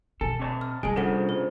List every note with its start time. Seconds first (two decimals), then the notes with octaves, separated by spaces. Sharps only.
0.21 B2 A4 G#5
0.39 C3 C#5 A5
0.61 F6
0.83 C3 G3 G#3 G#5 A5
0.96 G2 C#3 F3 A4 C5 F#5
1.29 C5